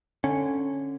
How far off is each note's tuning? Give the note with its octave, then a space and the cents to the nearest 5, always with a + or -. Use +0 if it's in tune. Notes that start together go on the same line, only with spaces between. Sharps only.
D3 +0 C#4 -10